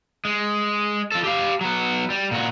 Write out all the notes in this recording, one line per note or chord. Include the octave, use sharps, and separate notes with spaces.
G#3
F3 A4
G4 F5
F#3 B3
G3
A#2 F#4